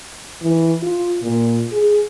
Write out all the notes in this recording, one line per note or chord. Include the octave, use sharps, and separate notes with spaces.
E3
F4
A#2
G#4